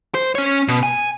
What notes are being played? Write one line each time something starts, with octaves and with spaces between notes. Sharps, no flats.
C5
C#4 C#5
B2
G#5